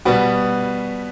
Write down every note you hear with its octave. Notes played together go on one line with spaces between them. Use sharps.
B2 G3 B3 F#4